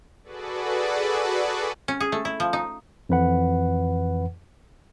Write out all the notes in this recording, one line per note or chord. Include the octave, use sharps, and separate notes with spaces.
F#4 G#4 A4 B4 D5
C#4
G#4
A3
E4
F3
D#4
F2 E3 B4 F#5